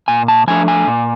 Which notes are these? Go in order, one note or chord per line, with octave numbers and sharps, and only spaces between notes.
A#2 G#5
A5
F3 A3 D4 G#5
G#5
A#2